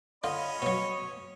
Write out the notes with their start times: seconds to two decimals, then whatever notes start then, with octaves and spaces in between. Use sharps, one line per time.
0.24 D3 C#4 F4 D#5 B5
0.62 B2 F#3 C#5